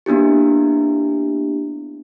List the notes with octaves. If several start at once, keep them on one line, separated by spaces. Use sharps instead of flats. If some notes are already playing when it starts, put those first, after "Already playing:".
A#3 B3 D4 E4 G4